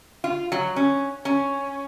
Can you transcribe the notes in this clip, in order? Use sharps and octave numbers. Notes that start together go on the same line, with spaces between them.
F4
F#3
C#4
C#4